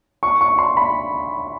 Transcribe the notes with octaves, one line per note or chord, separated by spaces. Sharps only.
C#6
C#6
C6
B5